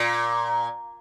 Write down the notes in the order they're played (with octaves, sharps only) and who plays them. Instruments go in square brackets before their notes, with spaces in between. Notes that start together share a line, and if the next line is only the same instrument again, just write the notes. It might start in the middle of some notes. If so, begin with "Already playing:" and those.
Already playing: [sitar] A#2